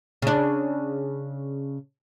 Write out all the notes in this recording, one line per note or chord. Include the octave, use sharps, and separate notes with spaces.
C#3 D4